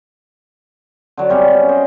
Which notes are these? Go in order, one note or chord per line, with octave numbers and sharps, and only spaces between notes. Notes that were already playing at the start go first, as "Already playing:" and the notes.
D3 F#3
C3 G3 B3 C#4
C#4
C5 D5 D#5